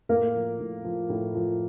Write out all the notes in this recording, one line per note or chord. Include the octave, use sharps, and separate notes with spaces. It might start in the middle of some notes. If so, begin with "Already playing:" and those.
A2 A#3 A#4
F3
A2
F3
A2
F3